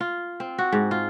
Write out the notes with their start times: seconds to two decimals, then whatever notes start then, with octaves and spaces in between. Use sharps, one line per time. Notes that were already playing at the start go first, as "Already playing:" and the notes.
0.01 F4
0.40 C4
0.58 F#4
0.73 G#2
0.91 F4